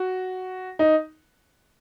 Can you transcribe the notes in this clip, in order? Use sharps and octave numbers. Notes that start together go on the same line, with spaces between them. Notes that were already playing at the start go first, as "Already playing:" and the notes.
Already playing: F#4
D#4